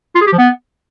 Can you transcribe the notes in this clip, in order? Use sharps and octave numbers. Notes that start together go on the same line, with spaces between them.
F4
G#4
G4
F3
B3